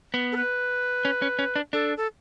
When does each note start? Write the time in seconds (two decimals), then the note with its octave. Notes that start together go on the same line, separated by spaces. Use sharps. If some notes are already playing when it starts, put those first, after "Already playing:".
0.14 B3
0.32 A4
0.36 B4
1.05 C#4
1.22 C#4
1.39 C#4
1.56 D4
1.73 D4 A4
1.97 A4